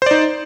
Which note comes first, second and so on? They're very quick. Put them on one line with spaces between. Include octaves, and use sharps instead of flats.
C5 D5 D#4